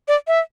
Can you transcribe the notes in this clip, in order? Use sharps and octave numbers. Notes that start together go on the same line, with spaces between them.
D5
E5